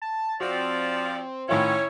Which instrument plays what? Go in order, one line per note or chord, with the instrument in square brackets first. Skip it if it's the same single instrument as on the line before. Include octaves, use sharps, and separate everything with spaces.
[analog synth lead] A5
[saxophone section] F3 D5 [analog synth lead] C4 [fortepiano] F#4
[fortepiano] A2 D#3 F4 [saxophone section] C#4 E4 [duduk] C#5